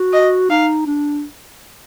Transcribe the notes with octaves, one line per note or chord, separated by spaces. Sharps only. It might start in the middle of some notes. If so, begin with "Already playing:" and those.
Already playing: F#4
D#5
D#4 F5
D4